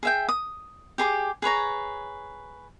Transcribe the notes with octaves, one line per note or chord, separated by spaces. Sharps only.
G#4 E5 G5
D#6
G4 G#4 B5 D6
G#4 B4 C#5 A#5